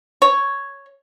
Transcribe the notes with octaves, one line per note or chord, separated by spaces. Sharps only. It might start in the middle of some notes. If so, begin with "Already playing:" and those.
C#5